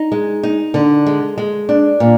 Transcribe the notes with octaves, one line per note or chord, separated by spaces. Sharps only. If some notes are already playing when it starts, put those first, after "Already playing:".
Already playing: D#4
G#3
D#4
D3
G#3
G#3
D4
A#2